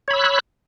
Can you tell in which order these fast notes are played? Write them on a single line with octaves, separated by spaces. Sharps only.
C#5 B5 E6 F#6